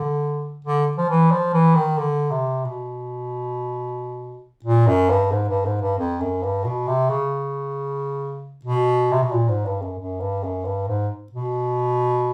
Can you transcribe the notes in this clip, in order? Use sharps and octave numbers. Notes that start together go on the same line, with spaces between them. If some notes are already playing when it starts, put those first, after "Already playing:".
Already playing: D3
D3
F3
E3
F3
E3
D#3
D3
C3
B2
A#2
F#2
G2
G#2
G2
G#2
G2
F2
F#2
G2
B2
C3
C#3
B2
C3
B2
A#2
G#2
G2
F#2
F#2
G2
F#2
G2
G#2
B2